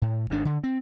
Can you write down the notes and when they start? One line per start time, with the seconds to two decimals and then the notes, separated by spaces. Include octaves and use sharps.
0.02 A2
0.30 G#1 G#2 D#3 D4
0.45 D3
0.64 C4